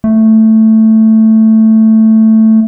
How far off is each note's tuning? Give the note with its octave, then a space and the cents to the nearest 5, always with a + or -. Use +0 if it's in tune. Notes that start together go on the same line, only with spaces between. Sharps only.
A3 +5